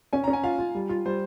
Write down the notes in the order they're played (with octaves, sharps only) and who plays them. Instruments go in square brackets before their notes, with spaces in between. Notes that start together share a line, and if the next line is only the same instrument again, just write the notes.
[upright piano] C#4 [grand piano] G#5
[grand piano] A#5
[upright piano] C#4
[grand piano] G#5
[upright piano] F4 [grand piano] F5
[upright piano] F4
G3
F4
[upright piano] G3 [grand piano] C5